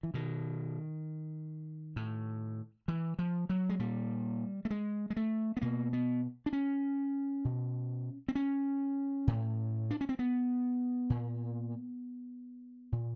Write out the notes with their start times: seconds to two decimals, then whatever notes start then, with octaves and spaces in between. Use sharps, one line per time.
0.03 E3
0.14 B2 D#3
1.96 A2
2.88 E3
3.19 F3
3.49 F#3
3.69 G#3
3.79 A#2 G3
4.65 A3
4.70 G#3
5.10 G#3
5.17 A3
5.57 B3
5.61 B2 A#3
5.93 B3
6.46 D4
6.53 C#4
7.45 B2
8.28 C4
8.35 C#4
9.27 A2
9.90 D4
10.01 C#4
10.09 C4
10.19 B3
11.10 A#2
12.92 A#2